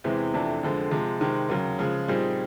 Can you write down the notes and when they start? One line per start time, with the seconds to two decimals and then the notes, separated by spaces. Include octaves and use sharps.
0.04 E2 C3 E3 G#3 C4
0.34 F2 C3 E3 A3 D4
0.63 F2 D3 F3 G#3
0.91 C3 F3 G#3
1.21 C3 D#3 G#3 C4
1.49 D#2 C#3 F#3
1.79 C#3 F3 G#3
2.08 A#2 G3 C4 D#4 G#4